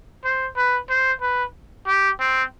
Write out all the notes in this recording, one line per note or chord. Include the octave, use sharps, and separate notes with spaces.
C5
B4
C5
B4
G4
C4